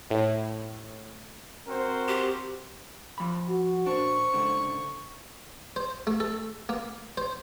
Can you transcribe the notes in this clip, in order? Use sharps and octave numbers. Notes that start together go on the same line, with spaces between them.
A2
C4 F#4 A#4 C5
G4
F3 B5
F#4
A#2 D4 C5 C#6
C#2 G#2 D3
C5
A3
A4
A#3
C5